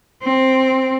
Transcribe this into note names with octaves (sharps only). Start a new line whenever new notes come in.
C4